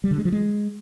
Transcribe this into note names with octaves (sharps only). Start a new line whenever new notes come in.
G3
D3
G#3
F3
G#3